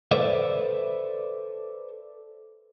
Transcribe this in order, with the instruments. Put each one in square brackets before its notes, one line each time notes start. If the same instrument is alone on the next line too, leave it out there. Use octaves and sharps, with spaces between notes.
[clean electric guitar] A4 B4 C5 D5 E5